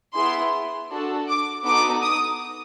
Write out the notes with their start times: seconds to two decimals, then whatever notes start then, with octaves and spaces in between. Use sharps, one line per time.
0.15 B3 E4 G#4 C6
0.91 D4 F#4 A4
1.28 D6
1.65 B3 D#4 F#4 A4 D6
2.02 D#6